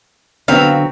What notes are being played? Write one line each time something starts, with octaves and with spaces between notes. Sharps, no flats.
D3 F#3 B3 C4 F5